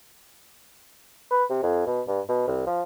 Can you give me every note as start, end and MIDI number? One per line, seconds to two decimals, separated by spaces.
1.31 1.44 71
1.50 1.59 48
1.63 1.84 41
1.87 2.02 47
2.08 2.21 43
2.29 2.44 47
2.47 2.64 36
2.67 2.83 53